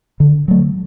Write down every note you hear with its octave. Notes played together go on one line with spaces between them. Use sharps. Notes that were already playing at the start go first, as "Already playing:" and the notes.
D3
F#3 A3